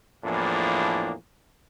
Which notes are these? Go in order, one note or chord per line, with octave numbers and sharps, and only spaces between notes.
E2 A2 F3 A#3 D4 G#4